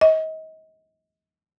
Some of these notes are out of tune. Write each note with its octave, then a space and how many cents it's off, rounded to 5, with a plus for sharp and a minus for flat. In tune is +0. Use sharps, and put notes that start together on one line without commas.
D#5 +30